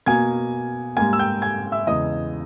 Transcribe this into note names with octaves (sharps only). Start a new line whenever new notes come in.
B2 A#3 G#5 G#6
G#2 G3 A#3 G#5 G#6
E6
G5 G6
G#5 G#6
E5 E6
E2 C#3 G#3 D#5 D#6